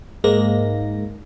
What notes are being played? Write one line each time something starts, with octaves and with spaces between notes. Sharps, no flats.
G#2 G#3 A#3 A#6